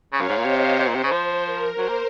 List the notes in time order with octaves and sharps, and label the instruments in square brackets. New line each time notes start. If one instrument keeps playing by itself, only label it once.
[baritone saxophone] C#3 [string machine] C#5 F5
[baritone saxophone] F#2
G#2
A#2
[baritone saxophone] C3 [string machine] C5 D#5
[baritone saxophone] C3 [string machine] C5
[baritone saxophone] A#2
C3
C#3
F3
[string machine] A#4
[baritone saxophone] F#3 [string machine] C5
[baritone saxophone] A#3